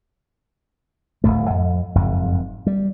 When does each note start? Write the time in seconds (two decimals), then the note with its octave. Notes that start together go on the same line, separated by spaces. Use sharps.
1.24 D1 F#2 A2 A3
1.50 F2
1.95 F#1 F2 G#2
2.66 G3